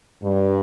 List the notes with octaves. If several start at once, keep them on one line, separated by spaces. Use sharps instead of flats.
G2